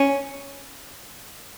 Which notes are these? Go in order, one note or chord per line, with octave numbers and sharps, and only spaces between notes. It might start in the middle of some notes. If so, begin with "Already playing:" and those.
Already playing: C#4